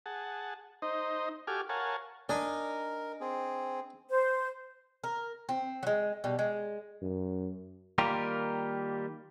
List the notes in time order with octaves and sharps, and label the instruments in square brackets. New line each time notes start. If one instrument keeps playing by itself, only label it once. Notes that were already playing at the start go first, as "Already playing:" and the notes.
[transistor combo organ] G#4 F#5 A5
D#4 C5 D#5
F#4 G4 A4 G#5 D6 F6
A#4 C#5 F5 F#5 G#5 A5
[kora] D4 [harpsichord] D#4 D#5 G#5 [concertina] A#4
[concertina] C4 G#4
[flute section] C5
[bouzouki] A#4
C4
F#3 G#3
B2 G3
G#3
[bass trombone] F#2
[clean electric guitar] D#3 G3 A#3 F4 G4 A#4